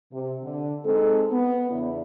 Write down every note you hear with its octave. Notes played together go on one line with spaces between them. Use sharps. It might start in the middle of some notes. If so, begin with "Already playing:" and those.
C3
D3
G#3 C4 D#4 A4
B3
E2 C#3 D4 E4